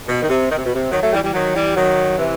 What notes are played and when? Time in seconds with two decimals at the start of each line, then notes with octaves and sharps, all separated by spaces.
0.08 B2
0.23 D#3
0.29 C3
0.50 D#3
0.58 C3
0.65 B2
0.74 C3
0.92 D#3 F#3
1.02 F#3 A3
1.13 E3 G3
1.23 E3 G3
1.34 D#3 F#3
1.55 E3 G3
1.76 D#3 F#3
2.18 C3 E3